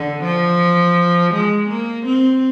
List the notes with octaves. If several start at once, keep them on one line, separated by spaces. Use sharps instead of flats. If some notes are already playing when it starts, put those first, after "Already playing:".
Already playing: D3
F3
G#3
A#3
C4